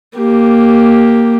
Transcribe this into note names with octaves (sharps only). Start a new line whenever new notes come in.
A#3 G4